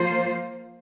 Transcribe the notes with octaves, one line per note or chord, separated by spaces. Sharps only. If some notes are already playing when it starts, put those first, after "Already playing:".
Already playing: F3 A#3 F4 C5